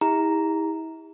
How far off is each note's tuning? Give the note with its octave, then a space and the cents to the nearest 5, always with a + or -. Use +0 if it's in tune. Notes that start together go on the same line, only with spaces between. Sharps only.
E4 -35 G4 +45 A#5 +0